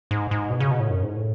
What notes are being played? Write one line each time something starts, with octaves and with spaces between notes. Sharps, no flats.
G#2
G#2
B2
C#3
B2
A2
F#2
G#2
A2